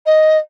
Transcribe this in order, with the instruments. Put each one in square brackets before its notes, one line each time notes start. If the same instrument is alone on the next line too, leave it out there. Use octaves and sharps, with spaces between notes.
[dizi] D#5